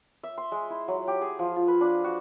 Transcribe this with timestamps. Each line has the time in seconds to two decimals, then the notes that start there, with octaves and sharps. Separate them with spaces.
0.23 E5
0.38 C6
0.52 G#3
0.70 E4
0.88 F#3
1.08 G4
1.21 G#4
1.39 F3
1.56 F4
1.68 B4
1.81 D4
2.04 F#4